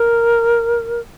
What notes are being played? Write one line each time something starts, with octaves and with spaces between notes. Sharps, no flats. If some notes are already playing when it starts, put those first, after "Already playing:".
Already playing: A#4